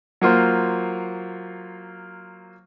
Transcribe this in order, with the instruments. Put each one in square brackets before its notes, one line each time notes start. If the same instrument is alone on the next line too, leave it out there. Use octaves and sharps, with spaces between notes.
[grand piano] F#3 A#3 F4 C5